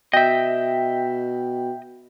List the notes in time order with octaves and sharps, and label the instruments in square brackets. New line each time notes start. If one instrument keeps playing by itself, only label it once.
[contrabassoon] B2 [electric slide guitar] D#5 E5 [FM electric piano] G5